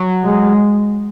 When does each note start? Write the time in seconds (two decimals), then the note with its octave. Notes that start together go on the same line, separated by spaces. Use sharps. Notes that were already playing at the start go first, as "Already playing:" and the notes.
Already playing: F#3
0.23 G#3